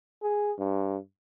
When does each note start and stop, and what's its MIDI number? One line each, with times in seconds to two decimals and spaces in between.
0.23 0.52 68
0.59 0.97 43